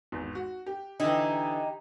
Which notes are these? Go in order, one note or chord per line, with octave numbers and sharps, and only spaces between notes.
G#1 E2
F#4
G4
D3 E3 D#4 E4 G4